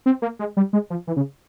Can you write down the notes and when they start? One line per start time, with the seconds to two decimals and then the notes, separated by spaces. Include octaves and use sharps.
0.06 C4
0.22 A#3
0.39 G#3
0.57 G3
0.73 G#3
0.90 F3
1.07 E3
1.16 C#3